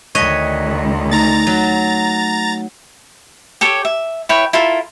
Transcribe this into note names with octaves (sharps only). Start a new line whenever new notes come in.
D2 D#3 C#5 D#5 C#6 F#6 B6
A3 D#4 A#5 A6
F#3
G4 A4 C#5 D6
E5
E4 B4 C#5 G5
E4 F4 A4 A#4